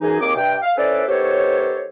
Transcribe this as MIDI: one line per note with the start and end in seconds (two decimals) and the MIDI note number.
0.02 0.18 42
0.02 0.18 52
0.02 0.18 63
0.02 0.18 68
0.21 0.33 39
0.21 0.33 58
0.21 0.33 60
0.21 0.33 68
0.21 0.33 86
0.36 0.56 43
0.36 0.56 48
0.36 0.56 79
0.62 0.71 77
0.77 1.04 61
0.77 1.04 64
0.77 1.04 69
0.77 1.04 71
0.77 1.04 72
0.77 1.04 74
1.08 1.88 51
1.08 1.88 59
1.08 1.88 67
1.08 1.88 69
1.08 1.88 72
1.08 1.88 73